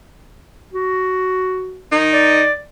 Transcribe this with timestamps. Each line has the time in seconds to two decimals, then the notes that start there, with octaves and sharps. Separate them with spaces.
0.73 F#4
1.91 D#3 D#4
2.13 D5